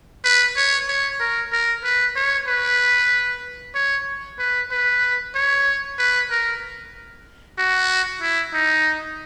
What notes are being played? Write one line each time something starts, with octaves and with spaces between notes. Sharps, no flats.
B4
C#5
C#5
A#4
A#4
B4
C#5
B4
C#5
B4
B4
C#5
B4
A#4
F#4
E4
D#4